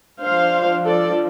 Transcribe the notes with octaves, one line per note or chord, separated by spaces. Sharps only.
F3 D4 C5 F5
A4 D5